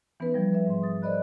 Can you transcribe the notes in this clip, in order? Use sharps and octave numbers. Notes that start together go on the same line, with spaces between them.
E3 B3 C#4 D#4 B4
F3 G3
B4 E5
G#2 C6
D#6 A6
A#4 C5 D5 D#5 B5 F#6